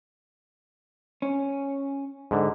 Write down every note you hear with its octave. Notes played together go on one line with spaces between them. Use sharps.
C#4
G#2 D3